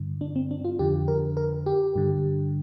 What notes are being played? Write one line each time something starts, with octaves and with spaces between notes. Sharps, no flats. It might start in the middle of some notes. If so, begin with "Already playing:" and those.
Already playing: G2 D3
D4
C4
D4
F4
F2 D3 G4
A#4
A#4
G4
G2 D3